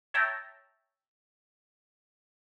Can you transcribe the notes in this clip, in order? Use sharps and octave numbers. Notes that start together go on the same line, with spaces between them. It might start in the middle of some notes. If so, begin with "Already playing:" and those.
C#5 E5 G5 A5 A#5